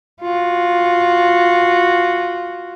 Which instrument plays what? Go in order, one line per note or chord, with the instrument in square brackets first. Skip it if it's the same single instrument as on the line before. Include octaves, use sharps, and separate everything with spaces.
[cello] F4 F#4